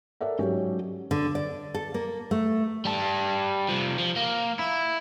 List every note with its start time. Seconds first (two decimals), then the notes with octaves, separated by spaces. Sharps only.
0.21 A4 A#4 D5 E5 F#5
0.39 G#2 F#3 C#4 G4 C#5
1.11 D3
1.35 D5
1.75 A4
1.94 A#3
2.31 A3
2.85 G3 A5
3.69 C3 F3
3.99 F3
4.16 A#3
4.59 E4